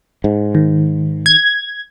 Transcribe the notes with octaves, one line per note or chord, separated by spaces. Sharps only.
G#2
D#3
G#6